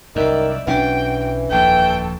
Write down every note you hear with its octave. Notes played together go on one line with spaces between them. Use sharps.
C2 F#2 D#3 D5 E5
B1 E3 C#4 D4 F#4 G5
D#1 A#1 F2 A4 G5 A5